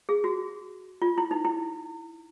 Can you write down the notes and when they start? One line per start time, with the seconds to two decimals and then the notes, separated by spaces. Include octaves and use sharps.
0.09 G#4
0.24 F#4
1.02 F4
1.18 E4
1.31 D#4
1.45 E4